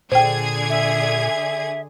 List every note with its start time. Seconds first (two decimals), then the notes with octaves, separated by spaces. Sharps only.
0.12 A#2 D3 G#4 C5 G5 G#6
0.70 E5